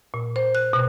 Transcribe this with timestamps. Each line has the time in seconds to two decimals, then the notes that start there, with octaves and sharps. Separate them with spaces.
0.14 A#2
0.36 C5
0.55 F#6
0.73 B2